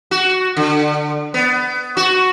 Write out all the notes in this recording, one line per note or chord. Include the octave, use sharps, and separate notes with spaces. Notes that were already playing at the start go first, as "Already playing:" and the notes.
F#4
D3
B3
F#4